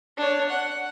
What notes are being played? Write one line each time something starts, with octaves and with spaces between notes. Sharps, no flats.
D4 C#5
F#5